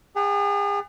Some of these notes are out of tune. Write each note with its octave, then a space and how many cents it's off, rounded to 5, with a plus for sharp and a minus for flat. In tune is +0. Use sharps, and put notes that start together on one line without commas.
G#4 -40 F#5 +35 A5 +0